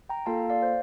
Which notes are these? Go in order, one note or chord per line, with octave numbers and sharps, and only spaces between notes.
G5 A#5
A#3 F4 A4 F5 A5
D5 F5
C5